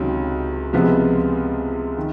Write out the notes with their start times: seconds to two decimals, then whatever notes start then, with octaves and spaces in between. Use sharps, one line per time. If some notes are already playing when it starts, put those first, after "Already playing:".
Already playing: C#2 C3 D#3 F#3
0.73 C#2 C3 F3 G#3 B3
1.98 D#3